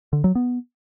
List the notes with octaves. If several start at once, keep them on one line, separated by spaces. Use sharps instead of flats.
D3
F#3
B3